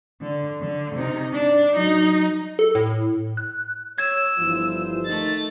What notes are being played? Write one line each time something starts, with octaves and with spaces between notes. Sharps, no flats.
D3
D3
C3 D#4
D4
F#3 D#4
A4
A2
F#6
C#5 E6 G#6
G1 E3 F3 F4 C5
D#3 A3 D#4 A6